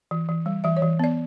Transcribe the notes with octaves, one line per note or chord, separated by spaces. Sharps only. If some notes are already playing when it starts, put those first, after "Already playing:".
E3
E3
G3
E3 E5
C#5
E3
B3 D5